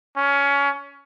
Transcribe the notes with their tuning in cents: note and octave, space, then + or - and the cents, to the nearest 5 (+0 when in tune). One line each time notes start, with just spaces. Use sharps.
C#4 +20